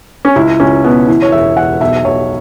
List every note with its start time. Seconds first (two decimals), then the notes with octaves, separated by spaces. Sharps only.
0.25 C#4
0.36 C#2 E4
0.60 C#2 C#4
0.84 B2 B3
1.08 E3 E4
1.22 C#5
1.32 E1 E5
1.57 E1 F#5
1.81 B1 E5
2.05 B1 C#5